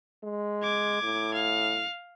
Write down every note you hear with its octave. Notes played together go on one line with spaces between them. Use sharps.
G#3
D6 G#6
A2
F5